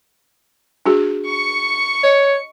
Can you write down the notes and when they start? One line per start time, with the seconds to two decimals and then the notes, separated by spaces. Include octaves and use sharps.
0.86 D4 F#4 G#4
1.26 C#6 C#7
2.03 C#5 D#5